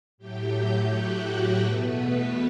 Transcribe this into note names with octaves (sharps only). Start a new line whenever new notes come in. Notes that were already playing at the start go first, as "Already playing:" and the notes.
A2 F#3 A3 G4 G5
F#4 F#5
E2 B2 A3 B3 B4